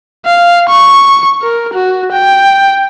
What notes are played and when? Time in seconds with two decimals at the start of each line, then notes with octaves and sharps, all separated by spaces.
0.26 F5
0.69 C#6
1.42 A#4
1.73 F#4
2.12 G5